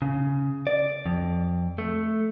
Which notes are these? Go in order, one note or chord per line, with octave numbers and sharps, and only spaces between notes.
C#3
D5
F2
A3